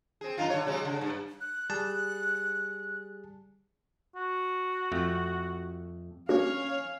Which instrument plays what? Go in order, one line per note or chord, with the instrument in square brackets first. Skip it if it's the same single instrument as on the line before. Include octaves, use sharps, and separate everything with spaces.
[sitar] C4 G#4
F#2 D#4 F4
D3 C#5
C3 F#3 G#3
C#3
G2
[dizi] F#6
[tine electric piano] G3 G#4 A5
[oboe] F#4
[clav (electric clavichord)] F2 A3
[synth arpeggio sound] A#3 D4 F#4 [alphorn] C#4 [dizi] C#5 [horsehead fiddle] F5